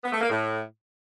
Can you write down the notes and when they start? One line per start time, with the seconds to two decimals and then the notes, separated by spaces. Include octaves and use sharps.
0.04 B3
0.12 A3
0.21 A#3
0.30 A2